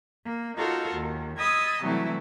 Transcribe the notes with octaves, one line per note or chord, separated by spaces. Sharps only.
A#3
D#4 F4 F#4 A4 A#4 C#5
D#2
D#5 B5 D#6 E6 G#6 A6
C3 E3 F#3 G3 A3 E4